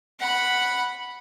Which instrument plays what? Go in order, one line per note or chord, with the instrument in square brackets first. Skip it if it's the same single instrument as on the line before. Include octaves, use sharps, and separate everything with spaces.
[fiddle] F#5 B5